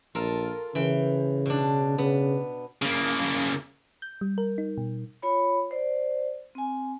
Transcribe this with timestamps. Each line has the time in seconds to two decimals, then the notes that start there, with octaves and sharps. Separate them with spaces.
0.15 A#1 F4 A4 A#4
0.75 C#3 E3 G5
1.46 B2 D4
1.98 C#3 B3
2.82 C#3 A#3
4.02 G6
4.21 G3
4.38 A#4
4.58 D#4
4.78 B2
5.22 F4 C#5 B5
5.71 C5 D5
6.55 C4 G#5